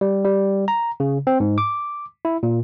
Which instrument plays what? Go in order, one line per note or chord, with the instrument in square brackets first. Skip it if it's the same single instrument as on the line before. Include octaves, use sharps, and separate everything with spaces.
[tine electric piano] G3
G3
A#5
C#3
C4
G#2
D6
E4
A#2